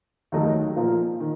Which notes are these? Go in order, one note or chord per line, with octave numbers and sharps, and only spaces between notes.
D#2 D#3 F#3 A3 D#4
A#2 F3 A#3
D#3